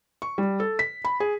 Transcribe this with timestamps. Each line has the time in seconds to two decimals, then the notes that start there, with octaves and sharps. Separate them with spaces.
0.22 C#6
0.38 G3
0.60 A4
0.79 B6
1.05 B5
1.20 G#4